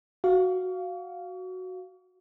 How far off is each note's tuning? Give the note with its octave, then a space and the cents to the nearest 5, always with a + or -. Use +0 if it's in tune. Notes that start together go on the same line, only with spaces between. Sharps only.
F#4 +0 F5 +0 C#6 +40